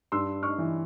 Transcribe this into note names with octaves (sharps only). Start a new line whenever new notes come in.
G2 C6 E6
C#6 F6
E3